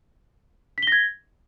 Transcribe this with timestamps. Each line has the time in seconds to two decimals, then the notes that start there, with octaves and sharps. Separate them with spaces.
0.78 B6
0.83 G7
0.87 A#6
0.92 G#6